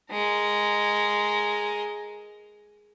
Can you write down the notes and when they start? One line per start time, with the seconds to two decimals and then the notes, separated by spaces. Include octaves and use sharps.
0.11 G#3 A#4